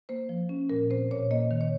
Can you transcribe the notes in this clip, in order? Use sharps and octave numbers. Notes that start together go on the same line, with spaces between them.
A#3 C5
F3
C#4
A#2 A#4
C4 C5
A#2 C#5
A#3 D#5
D#3
C#5